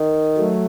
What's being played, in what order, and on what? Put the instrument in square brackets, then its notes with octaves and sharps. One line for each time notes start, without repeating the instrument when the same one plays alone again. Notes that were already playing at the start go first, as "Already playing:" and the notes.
Already playing: [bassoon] D#3
[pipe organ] F#3 A3